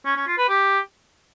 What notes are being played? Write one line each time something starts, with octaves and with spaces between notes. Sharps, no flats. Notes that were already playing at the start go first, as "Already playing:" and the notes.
C#4
C#4
F4
B4
G4